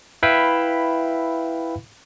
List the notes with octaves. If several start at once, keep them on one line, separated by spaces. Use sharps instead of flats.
E4 B4 E5 F5 G5 B5